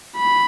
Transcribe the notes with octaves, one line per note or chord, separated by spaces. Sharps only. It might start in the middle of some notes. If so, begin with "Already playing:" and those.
B5